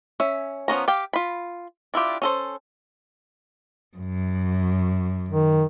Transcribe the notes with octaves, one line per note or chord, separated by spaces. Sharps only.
C#4 E5
F3 B3 C#4 A#5
G4 F5 G5
F4 B5
D4 E4 F4 G4
C#4 A4 C5
F#2
D#3